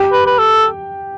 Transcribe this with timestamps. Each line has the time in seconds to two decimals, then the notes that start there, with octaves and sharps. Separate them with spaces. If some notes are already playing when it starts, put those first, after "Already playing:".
Already playing: G4 G5
0.12 B4
0.27 B4
0.39 A4